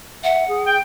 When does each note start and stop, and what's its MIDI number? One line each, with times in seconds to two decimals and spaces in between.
0.24 0.46 76
0.24 0.63 78
0.48 0.77 68
0.66 0.78 79